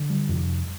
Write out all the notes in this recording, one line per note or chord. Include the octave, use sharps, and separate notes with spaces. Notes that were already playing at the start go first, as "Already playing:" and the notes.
Already playing: D3
G3
F2 C3